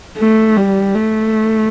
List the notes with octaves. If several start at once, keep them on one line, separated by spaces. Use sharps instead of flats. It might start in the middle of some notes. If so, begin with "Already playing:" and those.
A3
G3
A3